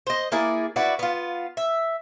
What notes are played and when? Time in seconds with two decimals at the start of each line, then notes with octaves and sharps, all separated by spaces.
0.07 C5 D#5
0.32 A#3 E4 G#4 D5
0.76 E4 F#4 B4 D5
0.99 B3 F4
1.57 E5